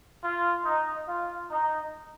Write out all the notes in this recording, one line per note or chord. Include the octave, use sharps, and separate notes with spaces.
F4
D#4
F4
D#4